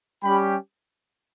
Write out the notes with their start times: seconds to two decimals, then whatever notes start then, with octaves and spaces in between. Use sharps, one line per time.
0.23 G3 C#4 G4 G5 B5